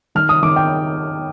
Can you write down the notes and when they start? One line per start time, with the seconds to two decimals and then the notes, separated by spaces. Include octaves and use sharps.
0.15 D#3 F6
0.29 D#6
0.42 D#3 D6
0.56 G5